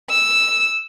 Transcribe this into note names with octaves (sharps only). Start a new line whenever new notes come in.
E6